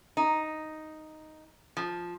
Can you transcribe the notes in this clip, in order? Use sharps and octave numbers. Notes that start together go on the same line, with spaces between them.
D#4
F3